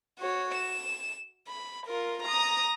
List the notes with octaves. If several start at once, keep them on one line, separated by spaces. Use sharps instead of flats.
F#4 C#5
E7
B5
F4 A#4
A#5 D#6